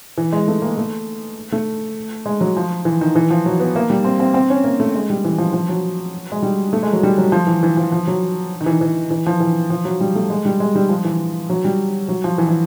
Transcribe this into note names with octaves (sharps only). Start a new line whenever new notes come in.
E3
G#3
A3
A#3
A3
A3
G#3
F#3
F3
E3
D#3
E3
F3
F#3
B3
A#3
G3
C4
C4
C4
C#4
A#3
A3
G#3
G3
E3
F3
F3
F#3
G#3
G3
A3
G#3
F#3
G3
F#3
F3
E3
E3
F3
F3
F#3
D#3
E3
E3
E3
F3
E3
F3
F#3
G3
A3
G#3
G3
G#3
G3
F3
E3
F#3
G3
F#3
F3
E3
E3